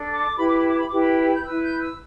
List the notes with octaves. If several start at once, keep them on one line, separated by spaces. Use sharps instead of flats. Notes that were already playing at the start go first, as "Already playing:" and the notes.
Already playing: D4 A4
D6
E4 G4 B4 B5
D6
B5
D6
B5
E4 G4 B4 D6
B5
G6
E4 B4 E6
G6
E6